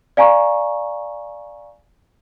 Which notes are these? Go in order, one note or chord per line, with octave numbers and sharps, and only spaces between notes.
D5 F5 G#5 A#5 C#6